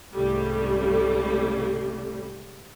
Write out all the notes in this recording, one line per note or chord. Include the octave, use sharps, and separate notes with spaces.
C2 G#2 C#3 G3 A3